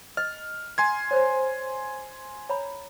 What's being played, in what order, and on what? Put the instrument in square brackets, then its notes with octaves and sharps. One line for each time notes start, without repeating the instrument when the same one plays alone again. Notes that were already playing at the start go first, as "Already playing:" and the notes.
[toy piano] D#5 [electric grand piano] F6
[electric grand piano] G#5 C6 G#6
[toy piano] C5 C#5
C#5 A#5 B5